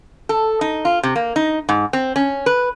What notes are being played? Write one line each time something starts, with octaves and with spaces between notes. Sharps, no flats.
A4
D#4
F4
C3
A#3
D#4
G#2
C4
C#4
B4